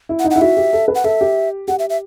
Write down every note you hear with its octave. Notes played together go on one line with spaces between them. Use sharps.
E4
F#5
D#4
F#5
E4
F#4 E5
G4
A4
B4
F#5
A4 E5
G4
G4 F#5
E5
E5